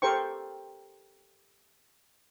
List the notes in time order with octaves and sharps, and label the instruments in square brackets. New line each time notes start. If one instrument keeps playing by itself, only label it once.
[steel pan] G4 A4 A#4 C5 G5 C#6